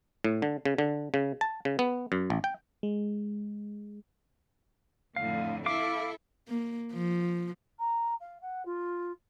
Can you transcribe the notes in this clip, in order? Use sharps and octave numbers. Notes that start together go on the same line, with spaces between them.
A2
D3
C#3
D3
C#3
A5
C#3
B3
F#2
A1
G5
G#3
F2 A2 D3 F5
E4 A4 F5 D6
A#3
F3
A#5
F5
F#5
F4